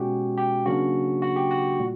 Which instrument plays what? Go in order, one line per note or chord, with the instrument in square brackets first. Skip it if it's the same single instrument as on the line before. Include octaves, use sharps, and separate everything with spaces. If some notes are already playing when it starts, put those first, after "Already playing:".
Already playing: [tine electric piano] B2 G#3 C#4 F#4 G4
G4
C#3 F#3 A#3 D4 F#4
F#4
G4
F#4
A#2 G3